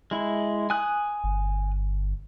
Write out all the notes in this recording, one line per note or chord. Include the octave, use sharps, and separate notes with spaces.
G#3 E4
G#5 D#6 F#6
G1